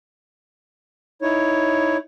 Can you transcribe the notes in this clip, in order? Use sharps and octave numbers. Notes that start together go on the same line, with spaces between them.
D#4 E4 C#5